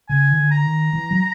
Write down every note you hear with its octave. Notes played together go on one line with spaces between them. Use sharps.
C#3 G#5
D#3
D3
A#5
D#3
E3
F#3